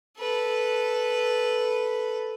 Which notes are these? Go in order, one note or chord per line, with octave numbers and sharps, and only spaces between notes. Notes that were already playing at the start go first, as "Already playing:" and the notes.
A4 B4